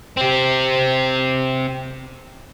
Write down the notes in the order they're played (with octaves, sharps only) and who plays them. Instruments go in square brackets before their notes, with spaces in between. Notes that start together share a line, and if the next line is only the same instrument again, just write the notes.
[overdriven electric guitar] C4 G4